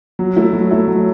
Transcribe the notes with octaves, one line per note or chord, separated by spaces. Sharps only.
F#3
A3 E4
F#3
A3 E4
F#3